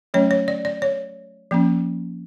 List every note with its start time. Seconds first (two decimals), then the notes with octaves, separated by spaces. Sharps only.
0.14 F#3 A3 C#4 C#5
0.31 C#5
0.48 D5
0.65 D5
0.82 C#5
1.51 F3 A#3 C#4